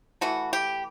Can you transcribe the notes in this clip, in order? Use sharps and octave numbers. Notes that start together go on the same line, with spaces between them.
E3 A3 F#4
G4